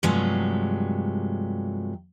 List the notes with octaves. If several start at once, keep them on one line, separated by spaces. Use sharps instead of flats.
G2 C3 F3 F#3 G#3 A3